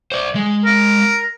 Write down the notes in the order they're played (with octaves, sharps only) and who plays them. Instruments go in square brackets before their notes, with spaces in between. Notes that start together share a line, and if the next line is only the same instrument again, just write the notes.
[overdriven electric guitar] C5 D5
G#3
[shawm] A#4